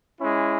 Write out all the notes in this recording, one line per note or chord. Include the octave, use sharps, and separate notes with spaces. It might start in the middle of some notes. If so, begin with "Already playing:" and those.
G#3 C#4 E4